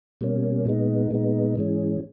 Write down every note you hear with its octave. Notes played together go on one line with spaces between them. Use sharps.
B2 G3 A#3 C#4
A#2 G#3 B3 D#4
A#2 G#3 B3 D#4
G#2 E3 G#3 C#4